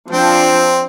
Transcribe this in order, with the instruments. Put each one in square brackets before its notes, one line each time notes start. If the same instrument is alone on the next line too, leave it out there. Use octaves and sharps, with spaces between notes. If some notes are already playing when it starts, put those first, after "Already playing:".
[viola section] F3 D4 G5 [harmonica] C4